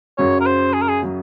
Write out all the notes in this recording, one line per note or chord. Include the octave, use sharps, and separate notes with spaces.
F#2 C#3 F#3 C#5
A#4
C5
G#4
A#4
G#4
C#3 F#3